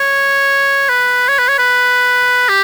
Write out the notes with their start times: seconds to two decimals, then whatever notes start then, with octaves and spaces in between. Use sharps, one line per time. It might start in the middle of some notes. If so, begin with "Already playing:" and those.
Already playing: C#5
0.89 B4
1.29 C#5
1.39 B4
1.49 C#5
1.59 B4
2.49 G4